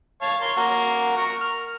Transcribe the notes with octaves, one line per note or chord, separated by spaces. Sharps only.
C#5 F5 A5
A#4 C#5 C6
A#3 F#4 A#4
A#4 C#6
F6